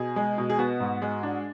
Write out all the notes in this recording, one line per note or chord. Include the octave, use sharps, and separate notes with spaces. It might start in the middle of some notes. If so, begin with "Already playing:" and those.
Already playing: B2 G#4
G#3
B2
G#4
B3 F#4
G#2
G#3
D4